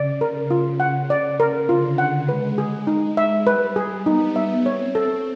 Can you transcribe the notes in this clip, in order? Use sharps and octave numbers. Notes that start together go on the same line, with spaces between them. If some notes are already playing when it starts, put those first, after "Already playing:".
Already playing: C#3 D5
A#4
C#3 F4
F#5
C#3 D5
A#4
D3 F4
D3 F#5
G#3 B4
G#4
G#3 D#4
E5
G3 B4
G#4
B3 D#4
E5
C4 C#5
A4